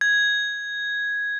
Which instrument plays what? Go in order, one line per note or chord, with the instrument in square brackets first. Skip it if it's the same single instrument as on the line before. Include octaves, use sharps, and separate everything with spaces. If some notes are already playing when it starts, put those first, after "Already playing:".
[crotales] G#6